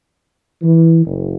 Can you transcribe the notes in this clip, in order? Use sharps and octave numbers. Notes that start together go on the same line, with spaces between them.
E3
F#1